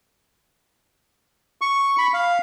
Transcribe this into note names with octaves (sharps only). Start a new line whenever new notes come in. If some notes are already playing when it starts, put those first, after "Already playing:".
C#6
B5
F5